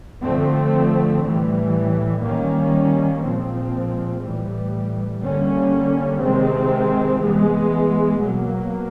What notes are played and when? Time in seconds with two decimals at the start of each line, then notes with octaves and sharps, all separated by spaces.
0.23 D3 F3 A3 C4
1.23 A2 E3 G3
2.23 D#3 G3 A#3 C#4
3.22 A#2 F3 G#3 C4
4.21 A2 E3 G3
5.21 D3 G3 A#3 C#4
6.21 C3 D#3 G#3 C4
7.21 E3 G#3 B3
8.20 B2 F#3 A#3